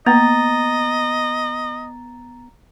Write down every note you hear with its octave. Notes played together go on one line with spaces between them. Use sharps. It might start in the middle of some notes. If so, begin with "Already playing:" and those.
A#3 B3 D#5 A#5 A6